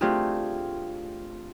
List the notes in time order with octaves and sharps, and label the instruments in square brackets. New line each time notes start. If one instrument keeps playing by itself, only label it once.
[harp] A3 C4 D4 F4 G4 G#4